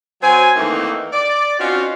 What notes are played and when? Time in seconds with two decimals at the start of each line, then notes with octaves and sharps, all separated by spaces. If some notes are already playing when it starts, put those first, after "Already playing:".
0.22 F#3 C4 F#4 G#5
0.56 D#3 E3 A3 A#3 C4 D#4
1.13 D5
1.58 C4 C#4 D#4 F4 F#4